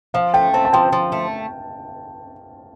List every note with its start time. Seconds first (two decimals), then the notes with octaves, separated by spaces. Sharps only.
0.14 F3 F5
0.34 A3 G5
0.53 C4 A5
0.65 A5
0.73 F3 G5
0.92 F3
1.12 A3